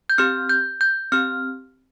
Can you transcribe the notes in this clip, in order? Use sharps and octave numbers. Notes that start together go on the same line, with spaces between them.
G6
C4 G4 F6
G6
G6
C4 G4 F6